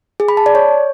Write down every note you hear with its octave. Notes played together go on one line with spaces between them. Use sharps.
G#4
B5
A5
D5
C#5